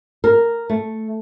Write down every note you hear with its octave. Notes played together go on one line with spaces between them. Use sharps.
A#4
A3